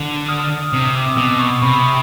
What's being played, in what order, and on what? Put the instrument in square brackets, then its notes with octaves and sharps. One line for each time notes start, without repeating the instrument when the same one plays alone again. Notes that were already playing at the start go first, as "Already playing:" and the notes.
Already playing: [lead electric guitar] D3
[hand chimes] D#6 F6
[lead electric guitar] C3 [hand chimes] D#6 F6
[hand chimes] D6 E6
[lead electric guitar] B2 [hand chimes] D6 E6
[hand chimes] C#6 D#6
[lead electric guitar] C3 [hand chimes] B5 C#6